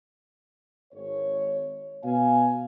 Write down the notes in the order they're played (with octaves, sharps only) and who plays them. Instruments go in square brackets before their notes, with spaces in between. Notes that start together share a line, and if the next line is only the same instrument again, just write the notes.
[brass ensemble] G#1 C#5
B2 F5 G#5